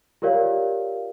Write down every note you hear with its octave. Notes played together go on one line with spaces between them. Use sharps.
F4 G4 A#4 C#5 D5 F5